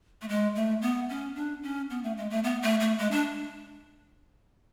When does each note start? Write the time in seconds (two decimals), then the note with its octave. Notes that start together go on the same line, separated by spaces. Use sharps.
0.22 A3
0.29 G#3
0.55 A3
0.82 B3
1.09 C#4
1.35 D4
1.63 C#4
1.90 B3
2.03 A3
2.17 G#3
2.30 A3
2.44 B3
2.62 A3
2.80 A3
2.98 G#3
3.11 D4